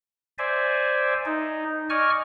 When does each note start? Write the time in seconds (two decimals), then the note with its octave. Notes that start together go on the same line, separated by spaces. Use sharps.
0.38 C5 D5 E5 G#5
1.26 D#4
1.90 D5 D#5 G#5 C#6 F6